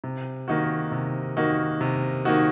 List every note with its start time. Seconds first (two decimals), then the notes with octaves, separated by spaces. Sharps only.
0.04 C3
0.48 D#3 A#3 D#4 F#4
0.92 C3
1.37 D#3 A#3 D#4 F#4
1.81 C3
2.25 D#3 A#3 D#4 F#4